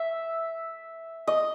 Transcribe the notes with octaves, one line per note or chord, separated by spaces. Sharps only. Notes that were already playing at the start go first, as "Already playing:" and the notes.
Already playing: E5
D#5